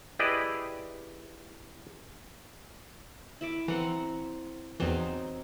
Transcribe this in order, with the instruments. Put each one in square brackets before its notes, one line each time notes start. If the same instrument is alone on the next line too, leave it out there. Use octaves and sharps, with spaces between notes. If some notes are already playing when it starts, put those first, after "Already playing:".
[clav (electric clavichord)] E4 G4 G#4 B4 D5 D#5
[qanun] E4 E5 D6
[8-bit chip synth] E3 [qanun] C4 F#5 A#5
[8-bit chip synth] E2 E3 [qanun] F#3 C4 D#4